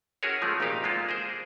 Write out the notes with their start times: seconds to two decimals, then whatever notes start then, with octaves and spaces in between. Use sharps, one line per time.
0.23 C#4 E4 F#4 G#4 A#4 C#5
0.42 F3 G#3 A3
0.60 G#1 A#2 D#4 G4 F5
0.84 G#3 A#3 F4 A4
1.09 G#4 A#4 C5